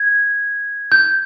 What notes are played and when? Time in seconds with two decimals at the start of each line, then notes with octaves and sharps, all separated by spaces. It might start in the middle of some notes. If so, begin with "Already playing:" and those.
Already playing: G#6
0.92 G6